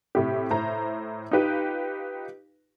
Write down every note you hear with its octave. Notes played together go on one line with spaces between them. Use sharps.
A2 C3 G4
A2 C5 A#5
D#4 F4 G4 B4